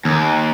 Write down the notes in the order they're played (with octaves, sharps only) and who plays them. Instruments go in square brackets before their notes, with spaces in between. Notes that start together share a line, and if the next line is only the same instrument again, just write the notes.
[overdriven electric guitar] D#2